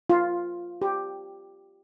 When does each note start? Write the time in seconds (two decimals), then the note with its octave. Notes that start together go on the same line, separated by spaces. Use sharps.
0.10 F4
0.82 G4